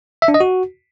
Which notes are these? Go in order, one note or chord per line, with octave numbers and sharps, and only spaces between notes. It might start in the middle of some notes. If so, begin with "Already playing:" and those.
E5
D4
D#5
F#4